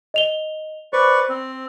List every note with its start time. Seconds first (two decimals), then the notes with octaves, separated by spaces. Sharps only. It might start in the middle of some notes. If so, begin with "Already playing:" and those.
0.14 D#5 F7 G7
0.93 B4 C5 D5 C#6
1.29 C4